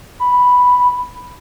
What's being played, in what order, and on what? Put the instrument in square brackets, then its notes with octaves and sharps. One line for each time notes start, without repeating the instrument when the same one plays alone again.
[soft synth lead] B5